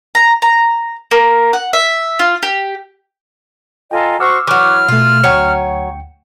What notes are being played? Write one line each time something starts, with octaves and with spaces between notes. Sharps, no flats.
A#5
A#5
A#3
F#5
E5
F4
G4
F4 A4 D#5 G5 G#5 A#5
F#4 C5 C#6 D6 E6 F6
E3 F#3 C#6 D6 F6 F#6
B2 A3 F4
D2 F#3 C#5 G5 C#7